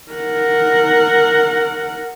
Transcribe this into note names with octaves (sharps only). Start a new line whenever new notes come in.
A#4 F#5